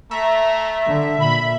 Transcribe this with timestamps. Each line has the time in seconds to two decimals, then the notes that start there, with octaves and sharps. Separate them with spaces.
0.11 A3 E5 A#5
0.86 D3
1.20 A#2 B5